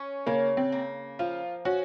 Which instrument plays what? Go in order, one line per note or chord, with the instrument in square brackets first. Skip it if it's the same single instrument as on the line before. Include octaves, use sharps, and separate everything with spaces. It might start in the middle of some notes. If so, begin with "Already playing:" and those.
Already playing: [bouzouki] C#4
[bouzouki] C#3 [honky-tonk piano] A#3
[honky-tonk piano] C4
[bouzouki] A#3
[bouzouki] F3 [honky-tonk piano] F4
[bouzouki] C#4 [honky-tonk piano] F#4